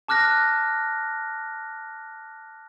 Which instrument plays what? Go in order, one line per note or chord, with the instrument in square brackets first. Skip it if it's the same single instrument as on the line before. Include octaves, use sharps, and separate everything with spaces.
[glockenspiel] A5 D6 F6 F#6 A#6